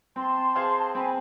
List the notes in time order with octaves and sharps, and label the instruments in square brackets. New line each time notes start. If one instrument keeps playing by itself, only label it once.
[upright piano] C4 [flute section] A5 C6
[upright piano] G#4 C5 F5
[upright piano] C4 [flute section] G#5 B5